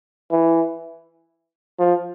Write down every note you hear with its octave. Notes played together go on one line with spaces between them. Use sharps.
E3
F3